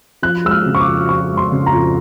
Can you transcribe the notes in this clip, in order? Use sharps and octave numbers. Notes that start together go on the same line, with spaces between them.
F3 F#6
G#3 E6
F6
C#3
C#6
D6
F2
F3 C#6
G#3
C6
C#3
A#5
F2